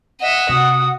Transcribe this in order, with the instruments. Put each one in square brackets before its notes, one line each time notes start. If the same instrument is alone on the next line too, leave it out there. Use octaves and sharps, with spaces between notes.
[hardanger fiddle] D#5 E5 [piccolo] F#5
[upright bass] C3 [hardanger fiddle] F#4 [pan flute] D#6